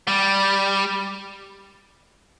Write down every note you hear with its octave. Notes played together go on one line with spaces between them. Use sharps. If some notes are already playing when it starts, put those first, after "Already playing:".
G3